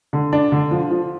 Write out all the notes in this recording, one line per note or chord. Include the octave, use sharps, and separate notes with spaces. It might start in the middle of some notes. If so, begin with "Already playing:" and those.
D3
D4
D3
F3
F3